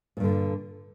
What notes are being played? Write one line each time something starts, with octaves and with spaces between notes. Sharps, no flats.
G2 A#2 D3